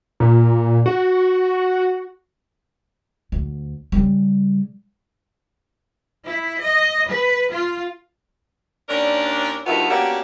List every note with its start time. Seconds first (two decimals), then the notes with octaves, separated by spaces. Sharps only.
0.20 A#2
0.86 F#4
3.32 D2
3.92 C#3 G3
6.25 E4
6.59 D#5
7.07 B4
7.51 F4
8.89 D#2 C#4 D4 A#4 D5
9.66 D2 G2 D#3 B3 F4 E5
9.90 A#3 B3 C#4 D4 F#4 G4